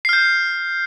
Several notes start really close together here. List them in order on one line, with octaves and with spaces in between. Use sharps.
C7 F6 G6